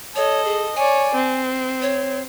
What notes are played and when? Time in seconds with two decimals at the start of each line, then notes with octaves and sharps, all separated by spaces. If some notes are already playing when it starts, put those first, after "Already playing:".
0.16 A4 C#5 D#5
0.45 G#4
0.76 C#5 D5 G#5
1.15 C4
1.82 C#5